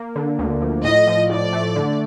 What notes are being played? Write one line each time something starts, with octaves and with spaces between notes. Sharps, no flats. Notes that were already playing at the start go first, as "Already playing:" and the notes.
Already playing: A#3
D3
D2
F3
A2 D#5
F3
A2 D5
A3
D3